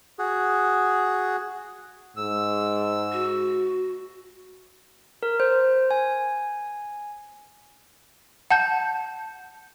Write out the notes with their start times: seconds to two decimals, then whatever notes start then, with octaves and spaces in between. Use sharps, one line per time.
0.19 F#4 G#4
2.17 G#2 E6
3.13 F#4
5.23 A#4
5.40 C5
5.91 G#5
8.51 F#5 A5 G6